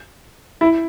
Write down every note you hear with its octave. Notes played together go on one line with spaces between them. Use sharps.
E4